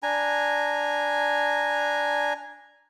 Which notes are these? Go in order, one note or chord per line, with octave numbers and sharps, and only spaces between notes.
D4 G#5 A#5